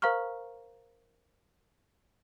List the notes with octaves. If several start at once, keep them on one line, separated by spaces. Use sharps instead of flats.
A#4 C5 F5 A#5 C#6 F6